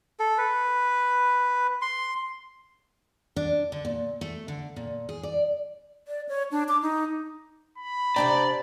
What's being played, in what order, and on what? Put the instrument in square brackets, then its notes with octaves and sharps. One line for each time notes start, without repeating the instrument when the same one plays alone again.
[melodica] A4
B4
C6
[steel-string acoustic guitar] D4
D3
A#2
A3
D3
A#2
G#4
D5
[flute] D5
C#5
D4
D6
D#4
[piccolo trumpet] B5
[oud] C3 D4 G4 [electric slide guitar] D5 [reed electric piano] A#5